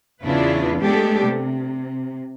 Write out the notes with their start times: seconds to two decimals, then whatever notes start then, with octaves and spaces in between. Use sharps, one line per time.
0.23 E2 C#3 D4 E4 F4 B4
0.80 G#3 A3 B3 D4 G4 A4
1.24 C3